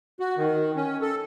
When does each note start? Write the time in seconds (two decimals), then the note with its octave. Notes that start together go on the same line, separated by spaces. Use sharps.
0.20 F#4
0.37 D#3
0.76 C#4
1.01 A4